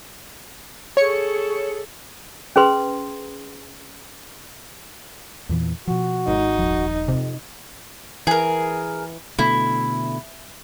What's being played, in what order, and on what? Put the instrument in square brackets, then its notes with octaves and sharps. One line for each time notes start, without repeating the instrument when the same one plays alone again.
[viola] G#4 A4 [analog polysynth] C#5 C#7
[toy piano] C#4 G#4 B4 C6
[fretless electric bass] E2 A#2 E3
[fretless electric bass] B2 F3 [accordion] F#4
[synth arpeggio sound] G#1 [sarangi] D#4
[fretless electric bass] D#1 F3
[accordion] F2 [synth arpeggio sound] C3
[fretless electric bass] E3 [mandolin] G#4 A#4
[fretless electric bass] B2 D3 A3 [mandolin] E4